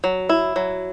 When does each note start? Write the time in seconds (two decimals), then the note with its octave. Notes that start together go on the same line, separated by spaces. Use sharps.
0.04 F#3
0.29 E4
0.56 F#3